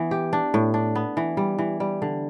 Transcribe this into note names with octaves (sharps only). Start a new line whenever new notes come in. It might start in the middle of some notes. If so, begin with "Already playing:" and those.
Already playing: E3 B3
G4
D4
A2
D4
B3
E3
G3
E3
G3
D3